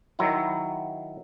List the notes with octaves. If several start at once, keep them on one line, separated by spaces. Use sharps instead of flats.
D#3 F#3 E4